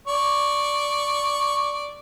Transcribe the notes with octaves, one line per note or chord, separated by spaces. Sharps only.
D5 C#6